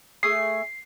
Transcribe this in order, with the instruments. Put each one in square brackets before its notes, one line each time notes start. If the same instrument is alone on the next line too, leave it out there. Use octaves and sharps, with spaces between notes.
[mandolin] A3 G#4 D#6 [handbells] C7